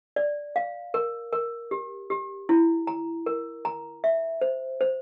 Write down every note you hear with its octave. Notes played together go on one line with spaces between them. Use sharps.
D5
F5
A#4
A#4
G4
G4
E4
A#5
A#4
A#5
E5
C5
C5